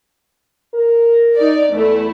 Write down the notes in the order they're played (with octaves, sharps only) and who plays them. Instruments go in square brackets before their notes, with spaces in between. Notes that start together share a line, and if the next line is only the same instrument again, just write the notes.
[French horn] A#4
[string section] D#4 D5
[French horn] E2 [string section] A3 E4